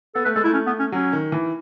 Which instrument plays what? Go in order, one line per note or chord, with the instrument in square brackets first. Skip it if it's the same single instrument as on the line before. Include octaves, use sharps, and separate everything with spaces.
[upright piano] B3 [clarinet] A4
[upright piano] A3 [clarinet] B4
[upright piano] G#3 [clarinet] A4
[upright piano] A3 [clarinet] E4
[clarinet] C#4
B3
C#4
[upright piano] F#3 [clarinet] C#4
[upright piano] D#3
E3